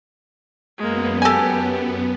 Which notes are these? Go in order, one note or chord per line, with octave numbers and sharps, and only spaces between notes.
F#2 G#3 A#3 B3
G4 A4 G#5